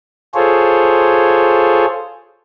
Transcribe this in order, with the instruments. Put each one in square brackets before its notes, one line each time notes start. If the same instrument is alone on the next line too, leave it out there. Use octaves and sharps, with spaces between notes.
[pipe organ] F4 G#4 A4 C5 C#5